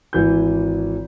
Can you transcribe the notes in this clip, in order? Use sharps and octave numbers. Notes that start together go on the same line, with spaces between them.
G#1 E3 G6